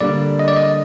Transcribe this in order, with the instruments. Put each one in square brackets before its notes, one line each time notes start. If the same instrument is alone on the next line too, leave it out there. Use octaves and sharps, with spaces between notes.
[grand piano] D3 G3 A#3 D4 [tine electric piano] D5
[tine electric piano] D#5
D5
D#5